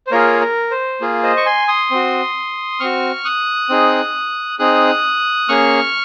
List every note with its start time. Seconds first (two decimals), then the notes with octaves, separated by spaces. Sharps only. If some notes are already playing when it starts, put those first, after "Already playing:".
0.07 C5
0.11 A#3 F4 G#4 A#4 C#5
0.41 A#4
0.71 C5
1.01 A#3 F4 G#4
1.23 C5 D#5
1.37 C#6
1.46 G#5 C6
1.68 C6 D#6
1.91 C4 F#4
2.80 C4 F#4 C#6 F6
3.25 D#6 F#6
3.69 C4 D#4 G#4
4.59 C4 D#4 G#4 D#6 F#6
5.48 A#3 C#4 G#4 C#6 F6